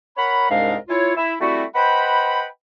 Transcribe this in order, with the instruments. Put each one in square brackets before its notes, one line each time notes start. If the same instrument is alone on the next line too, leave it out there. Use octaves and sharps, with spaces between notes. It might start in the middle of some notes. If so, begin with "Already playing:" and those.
[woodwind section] A#4 C#5 F#5 B5
C2 G#2 G#3 D4 A#4 F5
E4 F4 C#5
E4
G3 A3 C4 E4 F#4
B4 C5 D#5 F#5 G5 B5